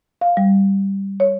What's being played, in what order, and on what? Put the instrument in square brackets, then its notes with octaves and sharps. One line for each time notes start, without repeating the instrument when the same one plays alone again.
[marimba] F5
G3
C#5